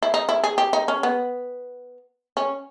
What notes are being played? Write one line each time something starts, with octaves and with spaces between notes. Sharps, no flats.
E4
D#4
E4
G#4
G4
D#4
C#4
B3
C#4